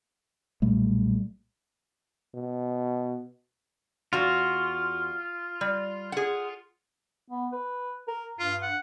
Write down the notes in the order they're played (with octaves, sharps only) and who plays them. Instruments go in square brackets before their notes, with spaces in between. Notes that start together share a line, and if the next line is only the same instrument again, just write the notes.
[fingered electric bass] B1 A#2 G3 A3
[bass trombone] B2
[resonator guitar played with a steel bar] E2 F#4 [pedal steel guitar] F4
[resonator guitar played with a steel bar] G3
G#4 F#5
[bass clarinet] B3
B4
A#4
[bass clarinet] G2 [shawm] F4
[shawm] F#5